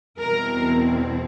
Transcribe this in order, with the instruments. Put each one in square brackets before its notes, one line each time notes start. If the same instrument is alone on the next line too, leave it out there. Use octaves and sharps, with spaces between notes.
[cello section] E2 B2 G3 C4 E4 A#4